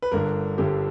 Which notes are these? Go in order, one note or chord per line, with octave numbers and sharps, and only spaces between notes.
B4
G1 G2 D3 A#4
G1 G2 D3 G4